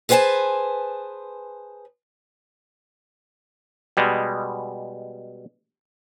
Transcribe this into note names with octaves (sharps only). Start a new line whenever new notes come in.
G#4 B4 C5 F#5 G#5 A5
B2 G3 G#3